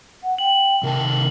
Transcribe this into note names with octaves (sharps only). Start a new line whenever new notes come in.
F#5
G5 F#7
C3 D#3 A#4 A5